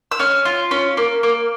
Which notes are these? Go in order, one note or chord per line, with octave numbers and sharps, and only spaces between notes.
E6
C#4 F6
F4
C#4
A#3
A#3